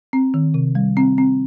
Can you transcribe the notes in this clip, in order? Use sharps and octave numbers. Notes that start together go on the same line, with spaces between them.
C4
D#3
C3
G3
C4
C4